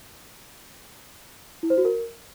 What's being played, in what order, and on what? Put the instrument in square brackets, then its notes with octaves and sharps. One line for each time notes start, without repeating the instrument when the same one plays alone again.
[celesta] E4
C5
F#4
A#4